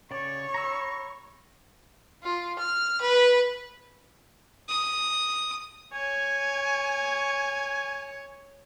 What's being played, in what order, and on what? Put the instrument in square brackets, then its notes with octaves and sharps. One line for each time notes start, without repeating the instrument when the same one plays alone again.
[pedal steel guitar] C#3 D5 [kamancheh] C#5 C#6
[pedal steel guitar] A#5 B5 E6
[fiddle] F4
F6
B4
[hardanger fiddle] D#6
[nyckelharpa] C#5 [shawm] G#5